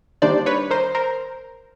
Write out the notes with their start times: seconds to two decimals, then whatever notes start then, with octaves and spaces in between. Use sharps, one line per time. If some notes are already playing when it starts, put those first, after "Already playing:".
0.22 D#3 G3 A#3 D4 C5 D5
0.46 B4 C#5
0.71 A#4 C5
0.95 A#4 C5